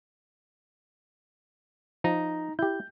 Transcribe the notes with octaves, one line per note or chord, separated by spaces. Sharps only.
F3 D#4 A#5
E4 G4 G6